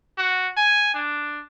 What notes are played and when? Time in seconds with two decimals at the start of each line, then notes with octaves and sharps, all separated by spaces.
0.18 F#4
0.57 G#5
0.94 D4